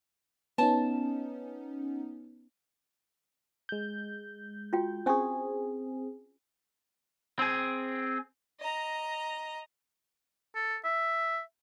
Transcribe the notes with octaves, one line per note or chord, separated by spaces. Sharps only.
B3 C#4 D#4 A5
G#3 G6
F4 F#4 G5
C4 C#4 G#4 G#5 C#6
C4 G#4
D#5 A#5
A4
E5